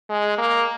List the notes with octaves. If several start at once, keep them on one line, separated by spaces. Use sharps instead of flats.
G#3
A#3